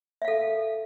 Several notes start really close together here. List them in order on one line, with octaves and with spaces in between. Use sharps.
E5 F5 A4